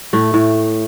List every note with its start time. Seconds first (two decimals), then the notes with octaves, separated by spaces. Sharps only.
0.13 A2 A3
0.34 A2